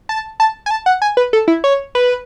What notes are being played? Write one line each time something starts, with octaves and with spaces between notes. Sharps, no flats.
A5
A5
G#5
A5
F#5
G#5
B4
A4
E4
C#5
B4